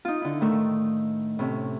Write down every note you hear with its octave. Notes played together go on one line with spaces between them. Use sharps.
D#4 F4
D3 E4
A2 D#3 A3 A#4 E6
A2 C3 C#4